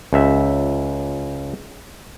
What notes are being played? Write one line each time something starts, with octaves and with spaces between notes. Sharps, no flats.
C#2 E5